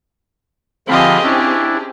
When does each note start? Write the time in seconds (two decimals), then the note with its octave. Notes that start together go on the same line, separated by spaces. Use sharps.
0.88 D3 F3 C4 F4 G4 G#4 D#5 B5
1.24 C#4 D4 E4